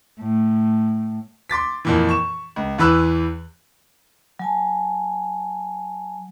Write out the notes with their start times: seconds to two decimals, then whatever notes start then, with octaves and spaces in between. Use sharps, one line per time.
0.20 A2
1.49 C6 D6 A6 B6
1.85 F2 A#2 E3
2.09 C#6 E7
2.56 C#2
2.78 E2 E3 B4 E6 F#6
4.39 F#3 G#5 A5